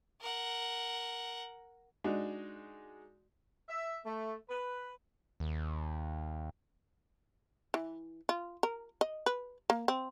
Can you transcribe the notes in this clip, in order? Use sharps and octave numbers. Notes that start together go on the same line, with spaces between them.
A#4 F#5
G#3 D4 D#4 F#4
E5
A3
B4
D#2
E3
F4
A#4
D#5
B4
A#3
C4